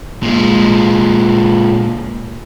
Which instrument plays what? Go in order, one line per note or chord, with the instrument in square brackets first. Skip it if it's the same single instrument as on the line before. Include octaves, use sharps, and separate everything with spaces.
[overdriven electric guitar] A#2 G#3